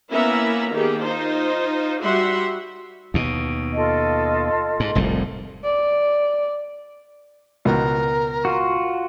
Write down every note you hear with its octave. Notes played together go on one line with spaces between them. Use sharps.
A#3 B3 C#4 E4 E5 A#5
D#3 A#3 B3 G4 G#4
D#4 F4 C5
G3 F#4 E5 F#5 C6
D#2 B2
F4 A4 D#5
G#2
F1 C2 A2
D5
C#2 B2 A#4
F4 F#4